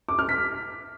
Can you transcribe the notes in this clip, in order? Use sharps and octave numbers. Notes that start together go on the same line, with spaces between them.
D6
F6
B6